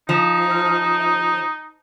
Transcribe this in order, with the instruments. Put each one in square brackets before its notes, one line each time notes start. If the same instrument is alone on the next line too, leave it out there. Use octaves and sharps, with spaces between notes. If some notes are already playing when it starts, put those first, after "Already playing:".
[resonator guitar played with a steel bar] F3 [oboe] D#4